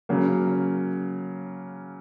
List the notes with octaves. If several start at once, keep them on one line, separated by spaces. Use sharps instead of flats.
C#3 F#3 A#3